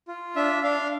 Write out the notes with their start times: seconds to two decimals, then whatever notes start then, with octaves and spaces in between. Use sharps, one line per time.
0.08 F4
0.36 D4 E5
0.63 D4 F5